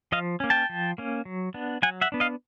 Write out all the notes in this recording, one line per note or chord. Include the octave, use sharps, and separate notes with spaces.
F3 D#5 F5
A#3 C#4
G5 A5
F3
A#3 C#4
F#3
B3 D4
F#3 F#5 G#5
E5 F#5
B3 D4
D#5 F5